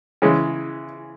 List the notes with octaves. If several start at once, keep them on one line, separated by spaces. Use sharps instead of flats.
C#3 E3 G#3